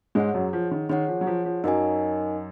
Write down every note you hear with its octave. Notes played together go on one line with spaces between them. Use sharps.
G#2 G#3 G#4 C#5 F#5
F#2 F#3
F3
D#3
D#3 G#4 C#5 F#5
F3
F#3
F3
F3
F#2 F#3 D#4 A#4 D#5 G#5